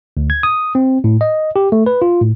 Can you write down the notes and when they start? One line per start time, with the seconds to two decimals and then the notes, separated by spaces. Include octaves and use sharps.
0.17 D2
0.30 G#6
0.43 D#6
0.75 C4
1.04 A2
1.21 D#5
1.56 G4
1.72 A3
1.86 B4
2.02 F4
2.21 A2